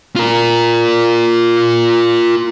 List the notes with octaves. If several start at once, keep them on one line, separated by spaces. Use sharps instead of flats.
F4 A#4